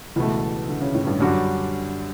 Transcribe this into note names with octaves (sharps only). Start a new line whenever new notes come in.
C#2 B2 E3 A3
D3
C#3
A2
G2
F#2 D3 G3 D4 F#4